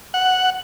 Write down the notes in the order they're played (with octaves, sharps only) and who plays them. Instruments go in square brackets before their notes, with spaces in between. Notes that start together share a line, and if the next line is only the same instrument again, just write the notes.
[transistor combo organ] F#5